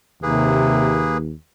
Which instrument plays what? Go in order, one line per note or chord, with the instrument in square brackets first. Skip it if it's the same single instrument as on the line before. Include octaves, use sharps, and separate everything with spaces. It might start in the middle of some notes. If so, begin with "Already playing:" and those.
[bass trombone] D#2 [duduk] C3 [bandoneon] A#3 G#4 B4